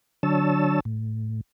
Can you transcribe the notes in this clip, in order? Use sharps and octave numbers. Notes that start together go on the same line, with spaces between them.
D3 F#3 D4 C#5 A5 E6
A2